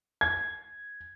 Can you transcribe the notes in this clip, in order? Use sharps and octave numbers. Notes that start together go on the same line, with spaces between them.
G#6